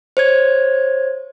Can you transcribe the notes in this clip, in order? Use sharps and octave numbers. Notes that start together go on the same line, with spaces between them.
C5 C#5 G#6